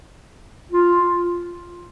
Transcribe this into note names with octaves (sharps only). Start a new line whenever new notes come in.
F4